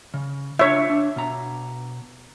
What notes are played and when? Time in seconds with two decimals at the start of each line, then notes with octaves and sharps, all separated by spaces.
0.14 C#3
0.59 D4 F4 C#5 E5
0.90 D4
1.16 B2 A#5